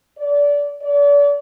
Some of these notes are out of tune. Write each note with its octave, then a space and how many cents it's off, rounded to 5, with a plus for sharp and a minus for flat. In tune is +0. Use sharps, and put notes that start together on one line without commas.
D5 -25
D5 -40